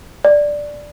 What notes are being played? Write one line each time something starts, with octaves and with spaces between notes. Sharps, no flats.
D5